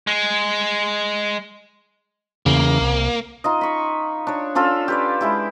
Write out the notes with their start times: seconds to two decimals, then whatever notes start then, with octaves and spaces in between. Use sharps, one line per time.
0.07 G#3
2.46 E2 C#3 A#3
2.81 C2
3.44 D#4 F4 D#5
3.61 B5 C#6
4.27 D4 C#5
4.55 C#4 D4 F4 A4
4.88 G4 B4 D5
5.21 G#3 E4 G4